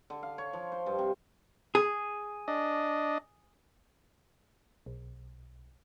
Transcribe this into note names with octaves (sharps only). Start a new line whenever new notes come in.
D3
F5
C#5
F3
C5
G2
C3
G#4
D4 D#5
B1